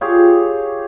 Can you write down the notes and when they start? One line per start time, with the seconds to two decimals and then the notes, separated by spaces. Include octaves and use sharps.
0.01 F4 G4 G#4 C#5